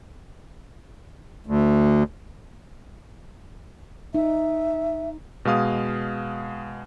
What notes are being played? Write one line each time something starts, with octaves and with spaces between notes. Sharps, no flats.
D2
D#4 E5
B2 G#3 F5 D#6